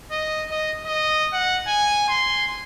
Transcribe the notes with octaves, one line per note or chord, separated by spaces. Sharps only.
D#5
D#5
D#5
F#5
G#5
C6